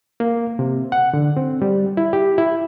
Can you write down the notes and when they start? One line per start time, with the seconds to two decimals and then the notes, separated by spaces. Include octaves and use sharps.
0.20 A#3
0.59 C3
0.92 F#5
1.14 D3
1.37 C4
1.62 G3
1.97 E4
2.13 G4
2.38 E4